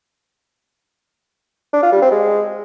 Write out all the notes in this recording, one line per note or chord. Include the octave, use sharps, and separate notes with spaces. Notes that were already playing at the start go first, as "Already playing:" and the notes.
D4
F4
G3
C4
G#3